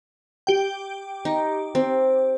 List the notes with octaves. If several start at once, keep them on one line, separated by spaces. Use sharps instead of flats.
G4 G5
D#4
C4